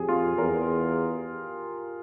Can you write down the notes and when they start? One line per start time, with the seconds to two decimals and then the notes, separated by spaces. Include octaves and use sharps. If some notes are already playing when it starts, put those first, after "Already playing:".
Already playing: F2 G4 G#4
0.09 F4
0.38 E2 A#4